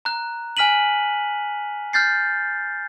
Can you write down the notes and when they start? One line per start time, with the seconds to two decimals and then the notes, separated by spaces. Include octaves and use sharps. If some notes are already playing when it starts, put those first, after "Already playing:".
0.05 A#5 F#6
0.57 G#5 F6 B6 D#7 F#7
1.93 F6 G6 A6 C7